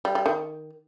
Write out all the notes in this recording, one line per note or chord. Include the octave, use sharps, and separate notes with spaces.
G3
G3
D#3